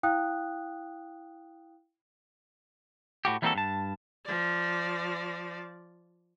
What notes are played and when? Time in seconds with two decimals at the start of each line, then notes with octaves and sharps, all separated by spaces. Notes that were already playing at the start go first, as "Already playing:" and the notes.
0.03 E4 F5 G5 D#6 F#6
3.25 A2 F#4 G4
3.42 E3 G3 A#3 C4 F#4 A4
3.55 G2 A5
4.25 F3 D5